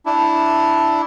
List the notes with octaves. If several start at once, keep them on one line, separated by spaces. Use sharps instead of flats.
D4 E4